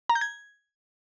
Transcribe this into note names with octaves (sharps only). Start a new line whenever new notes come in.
A#5
G6
G#6